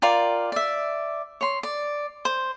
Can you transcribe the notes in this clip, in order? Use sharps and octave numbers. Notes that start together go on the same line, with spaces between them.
F4 A#4 D5 G5
D5 E5
C#5 C6
D5
C5